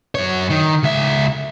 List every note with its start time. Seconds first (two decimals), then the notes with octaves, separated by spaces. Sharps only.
0.15 F#2 C#5
0.50 D#3
0.83 C#2 E5